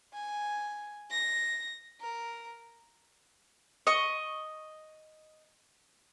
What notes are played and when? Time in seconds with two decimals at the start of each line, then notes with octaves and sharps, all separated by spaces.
0.14 G#5
1.10 A#6
2.00 A#4
3.87 D#5 C#6